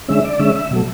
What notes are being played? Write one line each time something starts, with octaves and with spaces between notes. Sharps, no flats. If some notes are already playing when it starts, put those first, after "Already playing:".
D3 G#3 C#4 E5
D5
D3 G#3 C#4 E5
E5
B2 F#3 A3